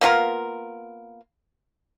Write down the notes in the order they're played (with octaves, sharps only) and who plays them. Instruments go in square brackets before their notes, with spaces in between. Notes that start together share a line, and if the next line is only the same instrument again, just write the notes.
[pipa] A#3 B3 F4 A#4